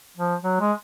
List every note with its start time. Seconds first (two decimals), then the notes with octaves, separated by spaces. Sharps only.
0.17 F3
0.43 F#3
0.60 G#3